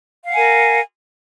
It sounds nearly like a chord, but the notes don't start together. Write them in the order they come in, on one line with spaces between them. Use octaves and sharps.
F5 F#5 G#5 A#4